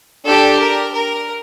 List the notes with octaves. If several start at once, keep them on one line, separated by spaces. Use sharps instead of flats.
D4 G4 A4
A#4
A#4